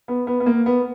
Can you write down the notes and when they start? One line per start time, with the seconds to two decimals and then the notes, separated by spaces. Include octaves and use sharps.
0.08 B3
0.27 B3
0.40 B3
0.46 A#3
0.66 B3